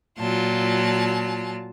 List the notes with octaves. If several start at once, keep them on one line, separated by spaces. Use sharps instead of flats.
A#2 F#3 F4 A5